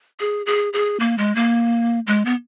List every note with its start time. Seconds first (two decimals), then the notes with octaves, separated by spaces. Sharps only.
0.20 G#4
0.46 G#4
0.73 G#4
1.00 A#3
1.18 G#3
1.36 A#3
2.07 G#3
2.25 B3